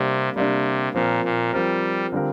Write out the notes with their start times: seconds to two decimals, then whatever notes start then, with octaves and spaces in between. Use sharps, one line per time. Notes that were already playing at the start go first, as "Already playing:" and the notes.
Already playing: C3 G3 A#3 D4
0.36 C3 G3 A#3 D4
0.94 A#2 F3 C4 A#4
1.24 A#2
1.53 F3 G3 C4 A#4
2.12 D3 G3 C4 F4 A#4